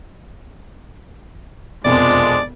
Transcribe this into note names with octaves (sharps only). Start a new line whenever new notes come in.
E1 C2 F2 F3 G#3 D4 D5